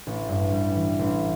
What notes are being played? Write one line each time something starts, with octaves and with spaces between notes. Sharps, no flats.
A1
G2
G3
E3
A1